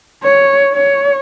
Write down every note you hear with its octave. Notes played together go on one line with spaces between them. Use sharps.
C#5
C#5